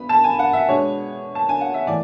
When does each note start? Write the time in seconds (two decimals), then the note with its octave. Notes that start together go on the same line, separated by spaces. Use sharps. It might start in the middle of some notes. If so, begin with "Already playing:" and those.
Already playing: B3 B5
0.09 A5
0.24 G#5
0.39 F#5
0.53 E5
0.69 B2 G#3 B3 D4 C#5
1.35 A5
1.49 G#5
1.61 F#5
1.74 E5
1.86 A2 E3 D5